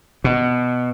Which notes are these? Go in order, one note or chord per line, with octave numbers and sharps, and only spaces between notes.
B2